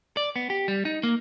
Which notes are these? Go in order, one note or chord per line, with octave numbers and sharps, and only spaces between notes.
D5
B3
G4
G3
D#4
A#3